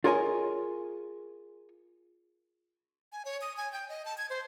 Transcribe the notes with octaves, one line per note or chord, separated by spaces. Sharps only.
F4 G#4 A#4 C#5 D#5 G#5
G#5
C#5
D#6
G#5
G5
D#5
A5
G#6
C5